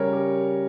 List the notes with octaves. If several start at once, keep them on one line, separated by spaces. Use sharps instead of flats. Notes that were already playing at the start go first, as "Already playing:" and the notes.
Already playing: C#3 G3 A#4 C#5
G4 A#4